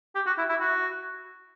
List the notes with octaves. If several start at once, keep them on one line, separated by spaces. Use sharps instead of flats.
G4
F#4
E4
E4
F#4